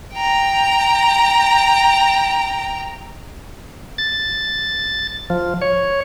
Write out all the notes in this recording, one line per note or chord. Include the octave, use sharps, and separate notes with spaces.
G5 A#5
A6
F3
C#5